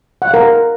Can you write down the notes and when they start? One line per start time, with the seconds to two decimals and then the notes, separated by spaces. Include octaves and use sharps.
0.22 F#5
0.28 F5
0.34 A#4